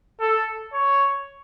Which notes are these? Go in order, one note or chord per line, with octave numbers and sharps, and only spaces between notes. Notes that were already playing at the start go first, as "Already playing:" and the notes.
A4
C#5